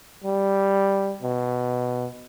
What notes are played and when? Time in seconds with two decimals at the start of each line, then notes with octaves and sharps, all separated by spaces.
0.24 G3
1.22 B2